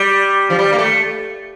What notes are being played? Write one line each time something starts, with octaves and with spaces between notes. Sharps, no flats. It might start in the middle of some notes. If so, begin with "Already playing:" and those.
Already playing: G3
F3
G3
A#3
A3